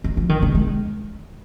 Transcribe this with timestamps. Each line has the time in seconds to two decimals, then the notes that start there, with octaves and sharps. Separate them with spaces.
0.04 D#3
0.17 F3
0.29 D#3
0.42 D3
0.55 G#3